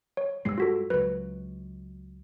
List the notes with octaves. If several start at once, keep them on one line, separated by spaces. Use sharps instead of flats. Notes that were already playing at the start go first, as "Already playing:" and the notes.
C#5
G2 G3 G#3 E6 C7
F4 F#4 A4
C#2 F#3 B4